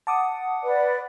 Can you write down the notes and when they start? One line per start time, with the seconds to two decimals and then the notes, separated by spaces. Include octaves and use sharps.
0.07 F#5 A5 D6 D#6
0.63 B4 D5